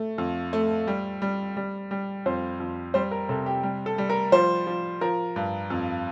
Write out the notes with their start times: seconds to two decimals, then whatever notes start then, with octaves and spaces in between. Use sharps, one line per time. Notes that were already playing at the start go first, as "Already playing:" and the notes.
Already playing: A3
0.18 F2
0.53 A3
0.87 G3
1.22 G3
1.57 G3
1.91 G3
2.26 F2 C5
2.60 F2
2.94 G3 C5
3.11 A#4
3.29 C3 A4
3.46 G4
3.63 G3
3.86 A4
3.98 G3
4.10 A#4
4.32 F3 C5
4.67 F3
5.01 F3 A#4
5.36 G2
5.70 F2